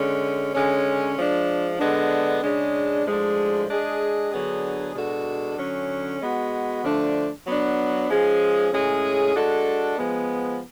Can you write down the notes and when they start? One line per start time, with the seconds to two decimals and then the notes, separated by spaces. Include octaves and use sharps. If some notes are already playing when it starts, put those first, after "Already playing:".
Already playing: D3 G#3 C#4
0.53 D3 G#3 C#4
1.16 F3 G#3 D4
1.79 D3 G#3 B3 D4
2.42 C#3 G#3 D4
3.05 A2 F3 G#3 D4
3.69 G#3 D4 G#4
4.31 D3 F#3 B3 D4 G#4
4.95 B2 G#3 D4 F#4 A4
5.57 D3 F#3 C#4
6.20 G#3 B3 F#4
6.84 D3 F3 A3 D4
7.46 F#3 B3 D4
8.10 F3 G#3 C#4 G#4
8.72 A2 G#3 C#4 G#4
9.36 G#3 D4 F#4 A4
9.98 F3 G#3 B3